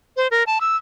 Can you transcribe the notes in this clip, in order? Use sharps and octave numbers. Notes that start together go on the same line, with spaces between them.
C5
A#4
A5
E6